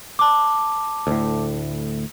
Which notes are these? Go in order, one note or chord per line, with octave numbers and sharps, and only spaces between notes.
A5 D6
D2 A2